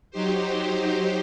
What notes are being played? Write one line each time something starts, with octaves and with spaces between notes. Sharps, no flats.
F#3 D#4 G4 C5